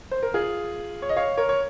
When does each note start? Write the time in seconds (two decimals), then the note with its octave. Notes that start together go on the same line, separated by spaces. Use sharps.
0.11 C5
0.23 A#4
0.34 F4 G#4
1.02 C#5
1.09 D#5
1.16 C#5 F5
1.37 A#4 C#5
1.49 C#5